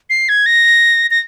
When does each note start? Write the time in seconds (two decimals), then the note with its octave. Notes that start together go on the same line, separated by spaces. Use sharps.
0.10 C7
0.29 G#6
0.46 A#6
1.11 A#6